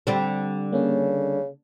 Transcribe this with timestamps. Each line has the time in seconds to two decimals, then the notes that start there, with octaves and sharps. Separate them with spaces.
0.07 D3 G3 C4
0.72 C#3 A#3 C#4